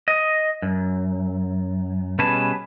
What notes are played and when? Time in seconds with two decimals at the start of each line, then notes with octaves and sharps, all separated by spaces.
0.08 D#5
0.62 F#2
2.19 B2 G3 C#4 G#4 B4 A5